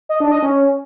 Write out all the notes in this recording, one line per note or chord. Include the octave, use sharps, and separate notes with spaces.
D#5
D4
D#5
C#4